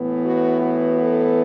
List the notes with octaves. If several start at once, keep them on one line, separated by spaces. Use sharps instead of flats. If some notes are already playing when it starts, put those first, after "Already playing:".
Already playing: A2 E3 B3
F#4
F#4
A4